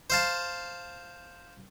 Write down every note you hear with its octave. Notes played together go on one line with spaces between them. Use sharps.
C5 F5 A5